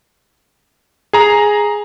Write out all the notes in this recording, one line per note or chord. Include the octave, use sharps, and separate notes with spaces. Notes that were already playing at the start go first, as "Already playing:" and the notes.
G#4 A#5